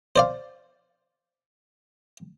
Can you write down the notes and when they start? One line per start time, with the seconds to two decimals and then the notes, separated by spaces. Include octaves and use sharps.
0.16 C5 D5 F5